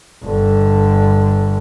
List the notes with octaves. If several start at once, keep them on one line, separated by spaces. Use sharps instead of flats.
G1 D3